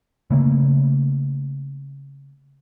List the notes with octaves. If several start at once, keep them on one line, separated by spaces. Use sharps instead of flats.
C#3 A3 A#3